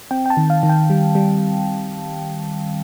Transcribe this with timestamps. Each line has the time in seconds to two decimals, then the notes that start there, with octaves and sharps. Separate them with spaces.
0.11 C4 G5
0.26 G5
0.30 A5
0.37 D#3
0.50 F5
0.63 D#3
0.69 G5
0.90 G3
1.15 G3